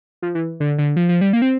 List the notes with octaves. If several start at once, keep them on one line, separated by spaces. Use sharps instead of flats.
F3
E3
D3
D3
F3
F3
G3
A#3
C4